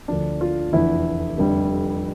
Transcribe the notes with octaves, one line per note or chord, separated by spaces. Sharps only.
D2 D3 F3 D4
F4
F1 E2 D3 E4
F1 F2 D3 G3